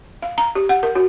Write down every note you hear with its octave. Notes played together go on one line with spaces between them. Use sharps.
F5
A#5
G4
F#5
A#4
F#4